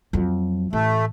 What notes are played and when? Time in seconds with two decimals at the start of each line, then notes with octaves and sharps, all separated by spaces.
0.13 F2 F#3
0.73 A1 A3